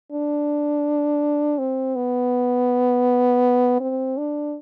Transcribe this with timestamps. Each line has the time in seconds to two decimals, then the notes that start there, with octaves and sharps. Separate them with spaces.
0.12 D4
1.59 C4
1.96 B3
3.80 C4
4.18 D4